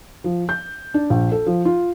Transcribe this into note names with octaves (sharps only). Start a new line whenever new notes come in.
F3
G6
D4
A#1
A4
F3
F4